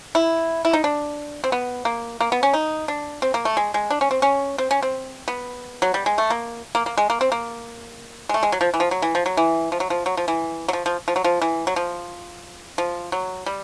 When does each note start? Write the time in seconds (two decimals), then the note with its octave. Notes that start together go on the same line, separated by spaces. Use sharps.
0.15 E4
0.65 E4
0.73 D#4
0.84 D4
1.44 C4
1.52 B3
1.85 A#3
2.20 A#3
2.32 B3
2.43 C#4
2.53 D#4
2.88 D4
3.22 C4
3.34 A#3
3.45 A3
3.57 G#3
3.74 G#3
3.91 D4
4.01 C#4
4.11 C4
4.22 C#4
4.58 C4
4.71 C#4
4.82 C4
5.28 B3
5.82 F#3
5.94 G3
6.06 G#3
6.18 A3
6.30 A#3
6.75 A#3
6.86 A#3
6.97 G#3
7.10 A#3
7.21 C4
7.32 A#3
8.29 G#3
8.34 A3
8.43 G#3
8.52 F#3
8.61 F3
8.74 E3
8.80 F3
8.91 F#3
9.02 E3
9.15 F3
9.26 F#3
9.37 E3
9.72 F3
9.80 F#3
9.90 F3
10.06 F#3
10.17 F3
10.28 E3
10.68 F#3
10.73 F3
10.86 F3
11.08 F3
11.16 F#3
11.24 F3
11.42 E3
11.67 F#3
11.76 F3
12.78 F3
13.12 F#3
13.46 G3